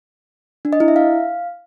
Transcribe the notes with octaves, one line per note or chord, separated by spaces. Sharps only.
D4
D#5
E4
E5
F5